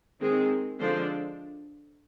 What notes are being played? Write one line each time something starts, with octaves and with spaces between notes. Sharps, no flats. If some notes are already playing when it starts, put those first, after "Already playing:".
D#3 G#3 C4 G#4
D3 F3 G#3 D4 C5